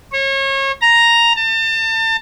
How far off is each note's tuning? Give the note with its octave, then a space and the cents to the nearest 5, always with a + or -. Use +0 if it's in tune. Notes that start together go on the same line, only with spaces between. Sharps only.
C#5 -30
A#5 +0
A5 +35